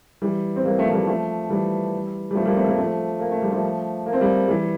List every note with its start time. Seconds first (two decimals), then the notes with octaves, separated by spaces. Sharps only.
0.22 E3 G3
0.56 C4
0.65 G3 A#3
0.79 F3 A3
0.89 A3
0.92 G3 A#3
1.07 F3 A3
1.50 E3 G3
2.31 G3
2.35 F3 A3
2.46 G3 A#3
2.57 A3 C4
2.67 G3 A#3
2.78 F3 A3
3.20 A#3
3.31 A3
3.42 G3
3.52 F3 A3
4.06 A#3
4.13 C4
4.21 G3 A#3
4.48 E3 G3